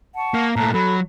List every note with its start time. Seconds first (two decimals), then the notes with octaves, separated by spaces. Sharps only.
0.16 F#5 A5 C#6
0.34 A#3
0.56 A#2 A3 A5 A#5 F#6
0.74 F#3 A4 B5